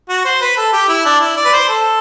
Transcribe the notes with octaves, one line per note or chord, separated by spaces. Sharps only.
F#4
C5
B4
A4
G4
E4
D4
E4
D5
B4
C5
A4